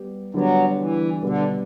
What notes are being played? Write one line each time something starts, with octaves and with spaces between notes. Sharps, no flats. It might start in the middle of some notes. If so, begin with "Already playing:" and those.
Already playing: G3 B3 G4
D3 F#3 G3 B3
E3
B2 D3 G3 B3